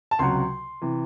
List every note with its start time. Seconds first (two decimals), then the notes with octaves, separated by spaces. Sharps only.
0.11 A5
0.19 C#2 C3 F#3 C6
0.82 C3 E3